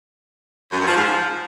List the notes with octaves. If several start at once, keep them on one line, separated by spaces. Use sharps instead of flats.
F#2
G2
F3
G#2
F3